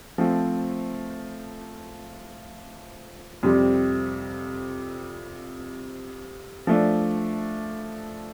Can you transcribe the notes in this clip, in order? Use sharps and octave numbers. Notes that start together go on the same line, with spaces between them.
F3 A3 C4
F2 C3 G3 C4 G4
F3 A3 D4